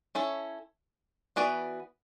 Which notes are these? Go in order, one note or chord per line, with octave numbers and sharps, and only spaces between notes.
C#4 E4 A4 C#5
E3 B3 F#4 B4 D5